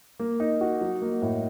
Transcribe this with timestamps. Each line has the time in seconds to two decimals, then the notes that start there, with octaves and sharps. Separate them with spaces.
0.19 A#3
0.40 D#4
0.61 F#4
0.81 F#3
1.02 A#3
1.22 A2